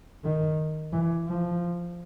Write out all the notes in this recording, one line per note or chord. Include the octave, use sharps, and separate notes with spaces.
D#3
E3
F3